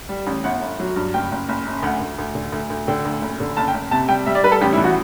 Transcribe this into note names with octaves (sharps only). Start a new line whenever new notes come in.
G3
A1
G1 F#5
G1
F#3
G2
F#1 G5
F#1
F#1
F#2
D2 F#5
D2
D2
D3
D2
D2
D3 G5
D2
F#1
D3
F#1 A5
G5
F#1
C3 A5
G3 G5
G3 E5
D5
G3 B4
A4
A1 G4
E4
E3
F#4